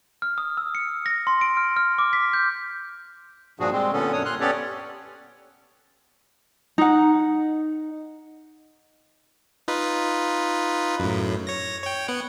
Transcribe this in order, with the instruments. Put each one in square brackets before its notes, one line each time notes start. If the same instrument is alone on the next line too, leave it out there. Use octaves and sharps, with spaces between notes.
[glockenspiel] F6
D#6
E6
C#7
A#6
C6
D7
F6
F6
D6
B6
G6
[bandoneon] G2 A#2 F3 D4 F#4 G#4
G3 G#3 C4
A#2 D3 B3 C#4 A4
F#2 D4 C#5 D#6
A#2 C6 F6 F#6
B3 C#4 G4 A4 C#5 D5
[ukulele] D#4 F#5
[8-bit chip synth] D#4 F4 B4
F#2 A2
C#5 A#6
C#5 G5
B3 F#5